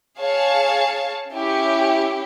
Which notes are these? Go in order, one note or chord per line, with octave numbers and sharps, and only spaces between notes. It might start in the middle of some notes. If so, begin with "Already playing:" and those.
G#4 C#5 F5 A5
C#4 E4 G4